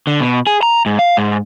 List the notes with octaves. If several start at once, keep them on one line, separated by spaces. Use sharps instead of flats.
D3
B2
G#4
A#5
G#2
F5
G#2